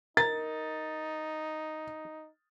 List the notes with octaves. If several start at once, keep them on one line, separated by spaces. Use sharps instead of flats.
D#4 A#4 A6